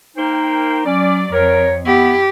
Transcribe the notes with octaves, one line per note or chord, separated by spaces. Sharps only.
A#3 D#4 C5 G5
F#3 C#4 D5
F2 A#4 C#5
B3 E4 G4 B5